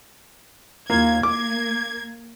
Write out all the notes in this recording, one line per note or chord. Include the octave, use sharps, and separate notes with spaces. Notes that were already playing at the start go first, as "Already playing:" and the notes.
D#2 A#3 F4 G#6
A#3 D6 G#6